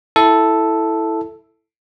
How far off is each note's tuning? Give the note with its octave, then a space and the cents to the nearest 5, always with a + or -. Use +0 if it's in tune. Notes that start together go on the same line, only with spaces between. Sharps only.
E4 +0 A4 +0